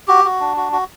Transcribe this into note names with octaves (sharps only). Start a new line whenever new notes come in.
F#4 G4
F#4
D4
F#4
F#4